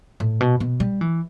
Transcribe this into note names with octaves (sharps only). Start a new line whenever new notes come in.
A2
B2
B2
G3
E3